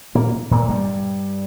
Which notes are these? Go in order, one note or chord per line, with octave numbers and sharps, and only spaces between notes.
A#2 A#3
A#2 A#3
G2 G3